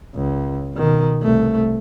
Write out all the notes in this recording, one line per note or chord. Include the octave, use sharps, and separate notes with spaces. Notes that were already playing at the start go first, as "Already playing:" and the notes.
C#2
B2 D#3
C2 A3